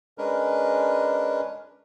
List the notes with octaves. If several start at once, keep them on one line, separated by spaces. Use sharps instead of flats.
G#3 C#4 D4 A#4 B4